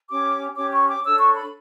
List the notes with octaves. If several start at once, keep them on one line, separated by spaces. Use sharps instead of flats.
C#4 G4 C#5 D6
C#4 G4 C#5 D6
C#6
D6
D4 A4 C#5 E6
C#6
B5